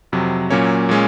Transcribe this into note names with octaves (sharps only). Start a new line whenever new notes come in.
F2 C3 F#3
A#2 F#3 A#3 C#4 C#5
A#2 G#3 C#4